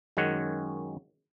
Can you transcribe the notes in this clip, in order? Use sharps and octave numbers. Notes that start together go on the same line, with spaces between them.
F#2 D#3 G#3 C#4 C#5 F#5